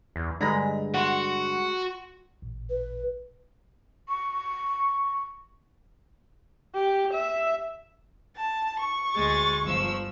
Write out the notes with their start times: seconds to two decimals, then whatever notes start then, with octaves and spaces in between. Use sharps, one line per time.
0.16 E2
0.41 G2 D3 G#3 A#5 B5 A#6
0.94 F#4 F#5 C6 E7
2.42 A1 A#2
2.70 B4
4.08 C#6
6.75 G4
7.14 E5
8.36 A5
8.79 C#6
9.15 D2 G#3 A6
9.64 G1 F3 E6